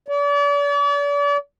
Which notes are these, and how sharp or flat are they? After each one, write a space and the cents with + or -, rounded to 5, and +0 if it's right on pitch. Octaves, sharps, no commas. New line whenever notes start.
D5 -40